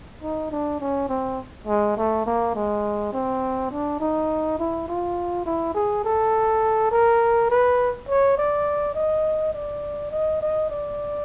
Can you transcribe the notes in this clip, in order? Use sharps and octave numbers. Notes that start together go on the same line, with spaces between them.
D#4
D4
C#4
C4
G#3
A3
A#3
G#3
C4
D4
D#4
E4
F4
E4
G#4
A4
A#4
B4
C#5
D5
D#5
D5
D#5
D#5
D5